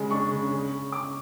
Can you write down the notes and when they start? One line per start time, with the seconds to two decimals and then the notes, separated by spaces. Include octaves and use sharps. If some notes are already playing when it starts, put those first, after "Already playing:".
Already playing: C#3 G#3
0.11 D4 C#6
0.32 C#3
0.51 C#3
0.72 C#3
0.92 C#3 D6